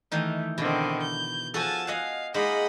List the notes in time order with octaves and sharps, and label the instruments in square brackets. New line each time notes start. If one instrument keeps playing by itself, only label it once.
[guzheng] D#3 E3 D#4 [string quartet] A3
[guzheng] B2 [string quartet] D3 D#3 C4
[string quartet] G6
[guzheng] F3 F#4 A4 [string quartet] G#5 A5
[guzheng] D#5 F#5 G#5 [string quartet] F5
[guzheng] G#3 A#3 D#4 [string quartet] D#5 F#5 B5